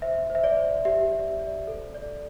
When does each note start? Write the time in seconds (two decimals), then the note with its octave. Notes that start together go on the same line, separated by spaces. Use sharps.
0.02 C5 E5
0.30 C5
0.35 E5
0.44 D5
0.57 C5
0.85 G4 E5
1.12 D5
1.40 D5
1.67 A4
1.95 D5